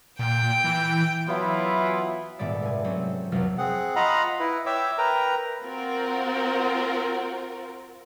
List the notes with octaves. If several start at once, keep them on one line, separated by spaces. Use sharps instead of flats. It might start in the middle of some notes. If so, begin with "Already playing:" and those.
A#2 G5
E3
E3 F#3 B3 E4 F4
D#1 G#2 A3 B3 D5 E5
F1 G#5
F#3 A3 C4 C#4
F1 B1 F2 F#3 F#4 F6
C4 G#4 F#5
F4 D#5 F5 F#5 A#5 B5
E4 B4
C#5 E5 G5 D6 E6
A#4 B4 G5 A#5
C4 F4 F#4 A#4